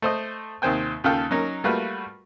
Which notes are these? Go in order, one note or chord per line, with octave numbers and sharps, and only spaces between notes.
A3 C5 D#5
D#2 C3 D#3 C5 G5 G#5
D#2 C#3 F4 A4 F5 G5
F#3 C#4 D#4 A#4
G3 A3 A#3 F4 F#4 B4